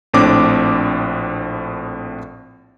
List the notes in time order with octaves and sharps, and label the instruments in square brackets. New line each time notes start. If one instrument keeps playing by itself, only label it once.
[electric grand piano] A#1 A2 C4 D4 D6